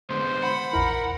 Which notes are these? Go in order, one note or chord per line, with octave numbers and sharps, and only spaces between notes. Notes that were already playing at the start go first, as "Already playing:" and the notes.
D3 G#3 B3 C5
F#5 B5
A#1 E2 E4 A#4